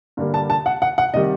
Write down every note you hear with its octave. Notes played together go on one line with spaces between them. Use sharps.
G2 D3 G3 A#3
A5
A5
F#5
F#5
F#5
C3 D#3 G3 D#5